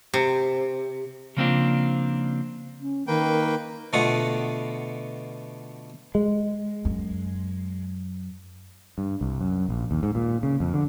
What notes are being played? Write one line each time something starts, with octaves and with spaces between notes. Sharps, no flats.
C3
C#3 F3 A#3 C4 D4 F4
C#4
D#3 A#3 B4 G5
B2 D3 A3 F4 F#5 D#6
G#3
F#2
G2
C2
F#2
A#1
D#2
G#2
A#2
C#3
F2
D3